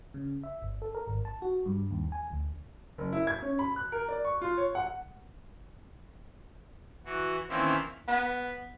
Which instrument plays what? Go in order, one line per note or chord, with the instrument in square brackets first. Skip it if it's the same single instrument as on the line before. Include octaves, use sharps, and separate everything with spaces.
[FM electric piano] C#3
E5
G1
A4
A#4
G#1
A5
F#4
G2
D#2
G#5
D2
[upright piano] F#1
E4
G#6
C#4
B5
F#6
A#4
D5
C#6
F4
C#5
F#5
[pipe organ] E3 F#4
D#3 E3 A#3 C4 C#4 E4
[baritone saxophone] B3